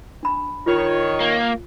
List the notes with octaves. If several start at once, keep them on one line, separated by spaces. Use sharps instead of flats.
D4 B5
D#3 F4 C#5
A#3